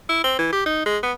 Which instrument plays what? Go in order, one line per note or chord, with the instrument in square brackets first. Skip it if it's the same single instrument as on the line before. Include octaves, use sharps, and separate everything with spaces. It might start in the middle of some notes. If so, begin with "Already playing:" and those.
[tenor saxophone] E4
C4
E3
G4
D#4
G#3
B3